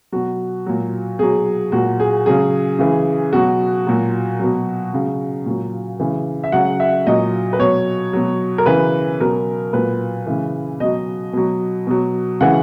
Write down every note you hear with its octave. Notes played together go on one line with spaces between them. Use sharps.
B2 F#3 F#4
A#2 F#3
B2 F#3 G#4
A#2 F#3 F#4
G#4
C#3 F#3 G#4
C#3 E3
B2 F#3 F#4
A#2 F#3
B2 F#3
C#3 F#3
A#2 F#3
C#3 E3
E5
C#3 F#3 F#5
E5
A#2 F#3 D#5
B4
B2 F#3 C#5
B2 F#3
A#4
C#3 E3 B4
B2 F#3 A#4
A#2 F#3 B4
C#3 E3
B2 F#3 D#5
B2 F#3
B2 F#3
C#3 E3 F#5